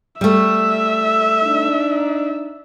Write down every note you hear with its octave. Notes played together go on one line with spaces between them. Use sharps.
G3 A3 E5
D4 D#4